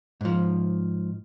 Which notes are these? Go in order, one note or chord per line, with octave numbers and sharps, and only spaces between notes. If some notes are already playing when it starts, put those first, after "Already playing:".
G#2 F3